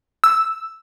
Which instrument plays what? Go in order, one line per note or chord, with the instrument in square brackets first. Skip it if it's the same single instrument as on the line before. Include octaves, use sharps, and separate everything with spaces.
[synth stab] E6